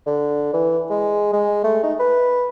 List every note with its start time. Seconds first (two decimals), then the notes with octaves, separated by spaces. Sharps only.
0.06 D3
0.53 E3
0.90 G#3
1.33 G#3
1.64 A3
1.83 D#4
1.99 B4